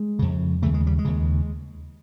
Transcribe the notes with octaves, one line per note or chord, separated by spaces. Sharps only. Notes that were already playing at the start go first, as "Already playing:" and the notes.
Already playing: G#3
F2 C#3
D#2 C#3 A3
G#3
G3
G#3
D#2 C#3